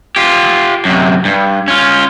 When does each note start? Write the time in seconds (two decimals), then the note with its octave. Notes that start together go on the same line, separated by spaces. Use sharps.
0.16 F4 G4
0.85 F#2 C3
1.25 G2
1.68 C#4 F4